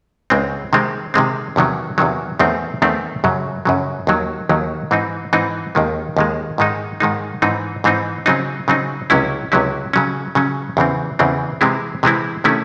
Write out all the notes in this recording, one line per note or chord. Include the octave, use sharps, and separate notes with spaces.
C#2 C#3 G#3 C4
C3 D#3 G#3 C4
C3 D#3 G#3 C4
E2 C3 D#3 F#3
E2 C3 D#3 F#3
E2 D#3 A3 C4
E2 D#3 A3 C4
F#2 C#3 F#3
F#2 C#3 F#3
D#2 D#3 F#3
D#2 D#3 F#3
G#2 E3 C4 D#4
G#2 E3 C4 D#4
D#2 D#3 G#3
D#2 D#3 G#3
G#2 D#3 G#3 D#4
G#2 D#3 G#3 D#4
G#2 E3 C4 D#4
G#2 E3 C4 D#4
C#3 F#3 C4 D#4
C#3 F#3 C4 D#4
C#2 C3 F#3 C#4 E4
C#2 C3 F#3 C#4 E4
C#3 F#3 C#4
C#3 F#3 C#4
E2 C#3 E3 C4
E2 C#3 E3 C4
C3 E3 G#3 C4 E4
C3 E3 G#3 C4 E4
C3 D#3 A3 C#4 E4